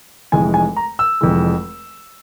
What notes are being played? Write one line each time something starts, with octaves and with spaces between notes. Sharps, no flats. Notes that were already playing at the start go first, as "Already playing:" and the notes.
F1 F2 E3 G#3 G#5
G#5
A#5
E6
F1 F2 E3 G#3